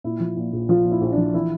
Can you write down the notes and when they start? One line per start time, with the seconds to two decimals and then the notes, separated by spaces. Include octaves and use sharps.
0.04 A#2 E4
0.20 F3
0.37 A#2
0.53 A#1
0.69 F3 F4
0.85 A#2
0.91 E4
1.01 A#1
1.12 D4
1.17 F3
1.34 E3 E4